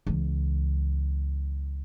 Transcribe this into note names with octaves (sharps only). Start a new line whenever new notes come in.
C#2 E3